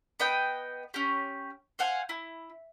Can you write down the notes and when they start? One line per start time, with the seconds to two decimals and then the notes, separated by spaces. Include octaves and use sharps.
0.20 B3 D#5 G5
0.94 C#4 G4
1.79 C5 F5 F#5 G#5
2.09 E4